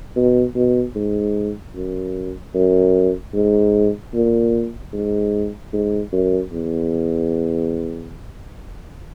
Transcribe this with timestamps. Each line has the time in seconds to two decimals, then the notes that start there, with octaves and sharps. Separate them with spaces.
0.16 B2
0.55 B2
0.95 G#2
1.75 F#2
2.55 F#2
3.34 G#2
4.14 A#2
4.93 G#2
5.73 G#2
6.12 F#2
6.52 E2